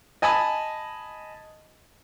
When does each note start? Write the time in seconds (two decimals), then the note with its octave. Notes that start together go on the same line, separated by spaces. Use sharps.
0.22 D#5 G#5 A5 B5 D#6